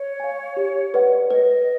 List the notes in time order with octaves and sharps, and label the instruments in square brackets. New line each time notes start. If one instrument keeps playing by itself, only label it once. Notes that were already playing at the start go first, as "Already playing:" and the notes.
Already playing: [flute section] C#5
[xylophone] F5 G#5
G4
B4 D5 F#5
[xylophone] B4 [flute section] D#5